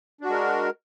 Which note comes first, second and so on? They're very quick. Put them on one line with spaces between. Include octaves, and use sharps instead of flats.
D4 F#4 G#3 A#4